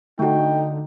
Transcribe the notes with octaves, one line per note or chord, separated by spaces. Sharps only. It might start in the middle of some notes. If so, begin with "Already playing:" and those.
D3 A3 D#4 F#4 G5